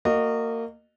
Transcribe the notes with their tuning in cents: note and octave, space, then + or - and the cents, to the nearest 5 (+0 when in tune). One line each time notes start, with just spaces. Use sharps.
A#3 -25 F#4 +0 D#5 -25